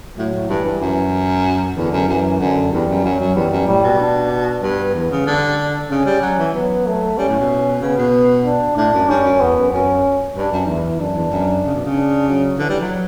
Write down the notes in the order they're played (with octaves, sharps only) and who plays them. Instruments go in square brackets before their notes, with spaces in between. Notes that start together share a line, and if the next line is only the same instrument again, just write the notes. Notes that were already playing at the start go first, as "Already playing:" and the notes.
[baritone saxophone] A2 [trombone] F#3
[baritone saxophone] A2
[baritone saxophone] G2 [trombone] E3
[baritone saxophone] G2
F#2
[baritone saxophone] E2 [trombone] D3
[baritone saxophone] F#2
[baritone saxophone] F#2 [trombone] E3
[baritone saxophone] F#2 [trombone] D3
[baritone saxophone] E2 [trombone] G3
[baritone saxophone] F#2
[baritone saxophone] F#2 [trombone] F#3
[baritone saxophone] F#2
[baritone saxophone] E2 [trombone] G3
[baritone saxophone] F#2
[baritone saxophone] A2 [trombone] G3
[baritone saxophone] B2
[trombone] D4
D4
[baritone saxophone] G2 [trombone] B3
[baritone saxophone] E2
C#3
[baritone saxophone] D3 [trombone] G3
[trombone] D4
[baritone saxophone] C#3 [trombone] C#4
[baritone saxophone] G3
F#3
E3
[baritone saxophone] F#3 [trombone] B3
[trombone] A3
[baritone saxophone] G3 [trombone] C#4
[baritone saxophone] A2
B2
[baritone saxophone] C#3 [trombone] B3
[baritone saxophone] B2
[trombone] D4
[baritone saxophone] A2 [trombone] D4
[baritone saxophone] F#2
[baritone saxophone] G2 [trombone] C#4
[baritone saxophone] F#2
[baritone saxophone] E2 [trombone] B3
[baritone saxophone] F#2
[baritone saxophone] F#2 [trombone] C#4
[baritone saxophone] G2 [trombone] D4
[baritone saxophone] F#2
[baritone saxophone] E2 [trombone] E4
[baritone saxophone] F#2 [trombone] D4
[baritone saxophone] E2
F#2
C#3
B2
C#3
[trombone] D4
F#3
[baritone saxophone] D3 [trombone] E3
[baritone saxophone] G3
F#3